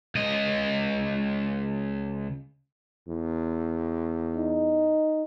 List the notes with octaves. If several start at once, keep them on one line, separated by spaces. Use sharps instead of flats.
C#2 D#5
E2
D#4